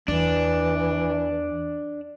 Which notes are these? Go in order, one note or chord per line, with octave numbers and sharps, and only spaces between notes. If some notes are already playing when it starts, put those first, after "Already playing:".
E2 E3 D4